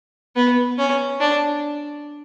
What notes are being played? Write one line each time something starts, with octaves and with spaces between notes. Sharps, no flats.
B3
C#4
D4